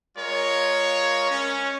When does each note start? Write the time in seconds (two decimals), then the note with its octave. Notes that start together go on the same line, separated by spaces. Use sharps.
0.17 G#3 F4 A#4 C#5
1.30 C#4